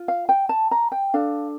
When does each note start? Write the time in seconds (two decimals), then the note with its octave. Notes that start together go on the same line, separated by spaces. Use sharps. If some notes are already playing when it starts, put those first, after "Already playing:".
Already playing: F4
0.08 F5
0.29 G5
0.49 A5
0.71 A#5
0.92 G5
1.14 D4 A4 F5